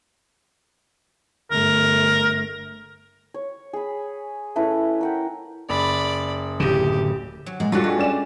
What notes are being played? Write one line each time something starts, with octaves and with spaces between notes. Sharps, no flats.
G1 A3 A#4
C#5
G#4 B5
A3 C#4 E4 B4
A#4 F#5 G5
F#1 D5 B5
D1 C#3 G4
F#3
A#2 G#3
G2 G3 D4 F4 F#4 A4
G#3
C#4 D5 E7